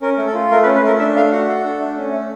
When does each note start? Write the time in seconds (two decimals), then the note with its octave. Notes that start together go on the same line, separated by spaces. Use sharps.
0.02 C#4 A#4
0.17 A3
0.27 A4
0.34 F4
0.51 A3 A#4
0.63 B4
0.66 C#4
0.75 B4
0.83 A3 A#4
0.99 D4 E5
1.15 A3 F5
1.31 F#4 F#5
1.48 A4
1.64 D4
1.80 A3
1.97 C#4
2.12 A3